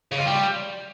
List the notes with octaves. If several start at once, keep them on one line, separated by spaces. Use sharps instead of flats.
C#3
F4
G3